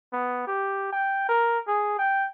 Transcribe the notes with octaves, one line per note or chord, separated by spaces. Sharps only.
B3
G4
G5
A#4
G#4
G5